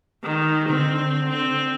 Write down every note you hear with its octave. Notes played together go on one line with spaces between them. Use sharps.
D#3
D3 C4
C4